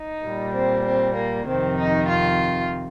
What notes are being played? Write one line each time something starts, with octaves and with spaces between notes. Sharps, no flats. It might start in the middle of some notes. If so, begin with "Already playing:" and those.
Already playing: D#4
A#2 G3
C4
C4
A#3
F2 C3 D#3 C4
D#4
F4